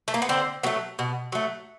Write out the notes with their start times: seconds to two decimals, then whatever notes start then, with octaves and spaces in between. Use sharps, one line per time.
0.08 A3
0.14 A#3
0.22 B3
0.29 D3 C4
0.63 F#3 A3 B3
0.99 B2
1.32 F#3 A3